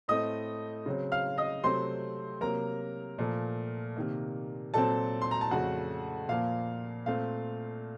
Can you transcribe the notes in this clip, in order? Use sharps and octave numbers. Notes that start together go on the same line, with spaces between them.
A2 A3 C4 D#5 D#6
C#3 F#3 C4
F5 F6
D#5 D#6
C3 F#3 A3 C4 C5 C6
C3 F#3 A#3 A#4 A#5
A#2 F3 A3
C3 D#3 A#3
A#2 F#3 C4 A4 A5
C6
A#5
A5
F2 C#3 A3 F#4 F#5
A#2 F3 A#3 F5
A#2 A3 C4 F5